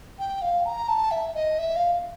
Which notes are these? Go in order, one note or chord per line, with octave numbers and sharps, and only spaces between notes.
G5
F5
A#5
A5
E5
D#5
E5
F5